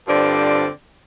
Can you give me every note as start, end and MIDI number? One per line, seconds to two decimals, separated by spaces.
0.08 0.68 43
0.08 0.68 50
0.08 0.68 60
0.08 0.68 65
0.08 0.68 72
0.08 0.68 74